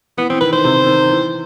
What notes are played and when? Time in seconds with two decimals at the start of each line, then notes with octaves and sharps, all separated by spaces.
0.17 E3 B3
0.30 E3 C4
0.41 D#3 B4
0.53 D#3 C5
0.64 C3
0.86 D#3
1.10 E3